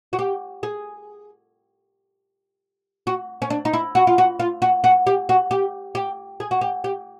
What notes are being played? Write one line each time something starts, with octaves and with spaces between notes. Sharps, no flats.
F#4
G4
G#4
F#4
C#4
D4
D#4
E4
F#4
F4
F#4
F4
F#4
F#4
G4
F#4
G4
G4
G#4
F#4
G4
G4